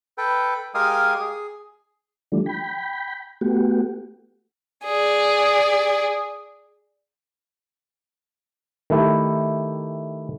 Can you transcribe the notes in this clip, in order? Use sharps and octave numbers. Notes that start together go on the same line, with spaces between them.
A4 B4 G5
G#3 G4 A#4 F5 G#5 D#6
G#4
E3 F3 G3 A3 D4
G5 B5
A3 B3 F#4 G4
G#4 D5
D#3 A3 E4 G4